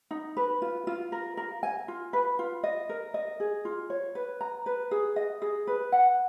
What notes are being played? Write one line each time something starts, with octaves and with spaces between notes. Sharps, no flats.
D#4
B4
F4
F4
A#4
A#4
G#5
F4
B4
F4
D#5
A#4
D#5
G#4
F4
C#5
B4
A#5
B4
G#4
D#5
G#4
B4
F#5